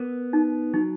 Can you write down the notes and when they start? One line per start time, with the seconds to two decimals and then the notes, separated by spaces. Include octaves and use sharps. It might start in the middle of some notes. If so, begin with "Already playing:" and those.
Already playing: B3 A#4
0.33 D#4
0.74 F#3 D#4